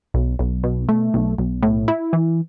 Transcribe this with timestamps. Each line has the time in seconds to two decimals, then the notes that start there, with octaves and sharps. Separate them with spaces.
0.14 B1
0.39 B1
0.64 B2
0.89 A3
1.14 B1
1.38 B1
1.63 A2
1.88 E4
2.13 E3